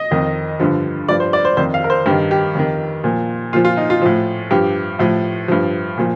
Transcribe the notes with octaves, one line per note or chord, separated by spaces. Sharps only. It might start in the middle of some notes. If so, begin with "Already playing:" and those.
Already playing: D#5
F2 D#3
G2 D3 F3
G2 F3 D5
C5
D5
C5
F2 D#3 C5
F5
A#4
C5
G2 D#3 G4
G4
F2 D#3
A#2 F3
A#2 F3 F4
F4
D#4
F4
A2 F3
G2 F3 G4
A2 F3
G2 F3
A#2 F3